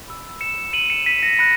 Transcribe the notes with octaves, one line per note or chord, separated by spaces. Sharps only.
B5 E6
C#7 E7
D#7 F#7
C#7 E7
B6 D#7
A#6 C#7
B5 F#6 A#6 C#7